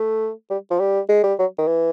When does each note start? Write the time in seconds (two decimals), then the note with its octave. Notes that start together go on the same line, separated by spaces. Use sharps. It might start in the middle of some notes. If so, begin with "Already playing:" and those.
Already playing: A3
0.50 G3
0.70 F3
0.79 G3
1.09 G#3
1.23 G3
1.39 F#3
1.58 D#3
1.67 E3